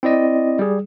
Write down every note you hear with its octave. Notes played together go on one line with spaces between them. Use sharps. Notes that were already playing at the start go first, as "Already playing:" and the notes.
C4 E4 D5 D#5
G3 G#4